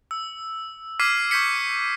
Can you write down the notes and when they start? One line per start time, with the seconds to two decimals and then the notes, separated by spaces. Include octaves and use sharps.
0.11 E6
1.00 D6 F6 G#6 B6 C7 D#7
1.31 C#6 G6 G#6 B6 C#7